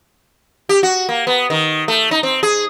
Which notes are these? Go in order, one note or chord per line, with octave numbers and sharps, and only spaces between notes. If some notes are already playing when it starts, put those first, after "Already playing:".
G4
F#4
A#3
B3
D#3
A3
D#4
C4
G#4